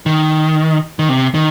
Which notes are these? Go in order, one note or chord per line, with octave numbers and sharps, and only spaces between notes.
D#3
D#3
C3
D#3